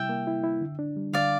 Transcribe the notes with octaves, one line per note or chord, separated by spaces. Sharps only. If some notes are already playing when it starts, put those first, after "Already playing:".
Already playing: C3 G3 E4 E5 G5
A#3
E4
E4
D3
D4
G3
D3 D5 F5